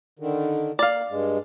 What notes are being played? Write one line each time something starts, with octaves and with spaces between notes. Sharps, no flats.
D3 D#3
A#3 D5 F5
G2 G#3